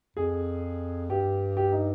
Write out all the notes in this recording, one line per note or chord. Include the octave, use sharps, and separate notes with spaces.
F2 G#4
G2 G4
G4
D#4